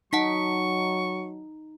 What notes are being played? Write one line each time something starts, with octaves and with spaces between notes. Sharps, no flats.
F#3 D#4 F#5 A5 C#6 B6